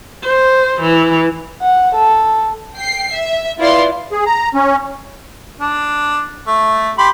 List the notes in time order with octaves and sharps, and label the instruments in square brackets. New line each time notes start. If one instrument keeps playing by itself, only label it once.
[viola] C5
E3
[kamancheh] F#5
A4
[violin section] G5 C7
E5
E4 F4 B4 D5 F5 C6
[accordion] G#4
A#5
C#4
[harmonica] D4
A3
G4 B5 C6